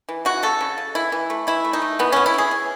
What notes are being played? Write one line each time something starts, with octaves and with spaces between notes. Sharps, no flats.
E3
C#3 F#4
C#3 A4
C#3
C#3
E3 E4
E3
A3
E3 E4
A3
D#4
A3
E3 B3
B3 C#4
E4
E3 G#4
E3